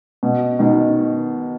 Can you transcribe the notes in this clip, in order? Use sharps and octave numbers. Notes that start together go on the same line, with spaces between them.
B2
B2 D#3